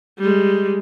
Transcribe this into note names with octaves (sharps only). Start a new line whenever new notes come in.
G3 G#3